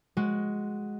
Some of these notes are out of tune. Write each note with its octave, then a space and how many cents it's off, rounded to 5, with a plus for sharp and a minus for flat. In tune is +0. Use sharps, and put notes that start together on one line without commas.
G#3 +5 F#4 +0